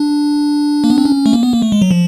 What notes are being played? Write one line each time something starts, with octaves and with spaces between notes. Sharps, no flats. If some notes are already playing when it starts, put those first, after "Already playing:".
Already playing: D4
A#3
B3
C4
C#4
A3
A#3
B3
A#3
A3
G#3
F#3
F3